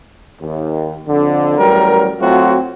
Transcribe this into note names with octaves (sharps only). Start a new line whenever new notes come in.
D#2
F2 D3
A1 F#3 G3 A#4
F#3 A3 C4 F4 F#4